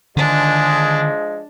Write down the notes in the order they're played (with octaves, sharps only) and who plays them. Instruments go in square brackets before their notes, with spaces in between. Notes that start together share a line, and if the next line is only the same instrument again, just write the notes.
[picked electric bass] D3 D#3 [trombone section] F3 G#3 [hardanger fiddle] D4